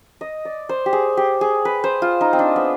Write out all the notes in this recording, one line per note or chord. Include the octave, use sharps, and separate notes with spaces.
D#5
D5
C5
G4
G#4
G4
G#4
B4
C5
F4
D#4
C4
D4
B3